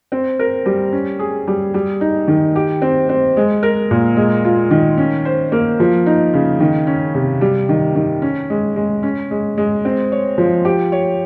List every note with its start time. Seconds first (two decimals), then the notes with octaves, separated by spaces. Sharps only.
0.12 C4
0.39 A#4
0.66 G3
0.92 C#4
1.19 G#4
1.47 G3
1.74 G3
2.01 D#4
2.28 D#3
2.56 G4
2.82 C4
3.09 C4
3.37 G#3
3.63 A#4
3.91 A#2
4.17 G#3
4.45 F4
4.71 D#3
4.98 C#4
5.25 C5
5.52 A#3
5.80 F3
6.06 D#4
6.34 C#3
6.60 D#3
6.87 C#4
7.15 C3
7.41 G3
7.69 D#3
7.95 D#3
8.22 C#4
8.50 G#3
8.76 G#3
9.03 C#4
9.31 G#3
9.58 G#3
9.85 C4
10.12 C#5
10.38 F3
10.65 G4
10.92 C#5